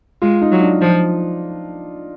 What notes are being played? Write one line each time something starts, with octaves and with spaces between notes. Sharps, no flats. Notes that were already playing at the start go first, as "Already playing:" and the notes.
G#3 F4
D#4
F#3
D4
F3